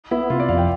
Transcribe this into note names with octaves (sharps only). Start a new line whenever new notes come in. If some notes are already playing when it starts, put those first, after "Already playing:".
B3 E4
C3 F4
D5
F2 F5
G5